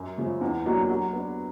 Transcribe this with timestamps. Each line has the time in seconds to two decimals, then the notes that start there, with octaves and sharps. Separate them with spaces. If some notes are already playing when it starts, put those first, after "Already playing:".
Already playing: F#2
0.18 C#3 F3 G#3
0.41 E2
0.66 B2 F#3 A#3 D4
0.89 F#3
1.13 B3 D4